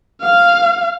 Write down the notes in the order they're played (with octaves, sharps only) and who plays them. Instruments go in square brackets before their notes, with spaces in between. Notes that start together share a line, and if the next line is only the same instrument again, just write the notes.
[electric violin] F5